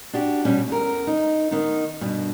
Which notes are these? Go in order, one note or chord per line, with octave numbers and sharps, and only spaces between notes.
D4 F#4 G4
B2 G3 C#4
E2 A#4
D#4
D#3 B3 D#4
G2 B2